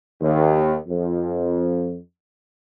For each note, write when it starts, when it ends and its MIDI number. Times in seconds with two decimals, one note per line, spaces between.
0.21 0.75 39
0.88 1.97 41